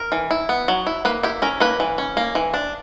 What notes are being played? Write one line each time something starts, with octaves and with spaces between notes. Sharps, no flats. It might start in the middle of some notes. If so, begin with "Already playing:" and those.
Already playing: A#4
E3
E4
B3
F#3
E4
A#3 B4
E4 G4
C#4 A#4
A#3 B4
E3
C#4
A#3
E3
D4